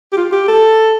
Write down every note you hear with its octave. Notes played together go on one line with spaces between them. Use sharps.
G4
F4
G4
A4